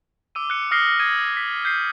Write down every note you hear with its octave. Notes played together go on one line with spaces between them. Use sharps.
D6 E6 D#7
F#6 C#7
D#6 F6 A#6 C7 C#7 G7
D#6 G#6 D#7
B6
G6 B6 C7